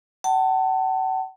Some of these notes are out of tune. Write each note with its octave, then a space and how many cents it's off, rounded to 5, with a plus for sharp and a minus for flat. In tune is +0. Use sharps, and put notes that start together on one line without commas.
F#5 +40 A5 +20